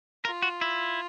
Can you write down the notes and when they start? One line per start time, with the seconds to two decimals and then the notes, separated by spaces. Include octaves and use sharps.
0.25 F4 A#4
0.42 F#4
0.61 E4